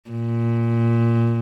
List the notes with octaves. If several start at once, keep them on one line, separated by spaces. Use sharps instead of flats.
A#2